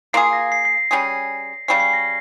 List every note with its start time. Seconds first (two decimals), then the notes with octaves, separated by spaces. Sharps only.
0.13 A#3 F4 G#4 C7
0.33 A#6
0.52 C7
0.65 C7
0.91 G3 C#4 G#4
1.68 C#3 G3 C#4 C7
1.80 C7
1.93 A#6